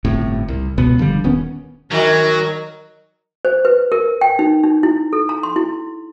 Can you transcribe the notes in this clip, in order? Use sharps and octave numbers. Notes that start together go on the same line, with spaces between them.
G1 A2 C3
C2
C#2 B2 B3
G1 D3 F3 G3
D#1 D#3 B3 C#4
D#3 F#3 D#4 F#4 A#4
C5
B4
A#4
G5
D#4
D#4
E4
A4
A#5
C6
E4